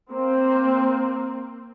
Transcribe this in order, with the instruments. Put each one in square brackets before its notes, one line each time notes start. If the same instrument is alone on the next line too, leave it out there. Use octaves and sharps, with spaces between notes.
[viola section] A#3 C4